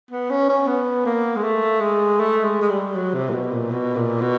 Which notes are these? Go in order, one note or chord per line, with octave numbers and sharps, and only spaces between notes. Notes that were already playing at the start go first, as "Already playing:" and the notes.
B3
C#4
C#4
B3
A#3
G#3
A3
G#3
A3
G#3
G#3
G3
F#3
C3
A#2
B2
A#2
B2
A#2
B2